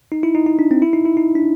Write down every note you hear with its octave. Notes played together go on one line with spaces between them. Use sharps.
D#4
E4
D#4
D#4
D4
C4
E4
D#4
E4
D#4
D4